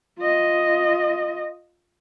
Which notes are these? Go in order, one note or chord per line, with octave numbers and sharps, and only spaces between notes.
F4 D#5